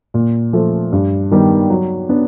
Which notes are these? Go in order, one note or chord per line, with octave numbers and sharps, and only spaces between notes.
A#2
F3 A3
G2
D#3 G3 B3 D#4
F#3
B3 D4